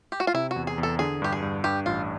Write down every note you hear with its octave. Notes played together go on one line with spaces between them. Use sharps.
G4
F#4
F4
C3 E4
F#4
E2
G#4
E2
A4
D3 G#4
G2 G4
G#4
G2
G2 G4
A1 F4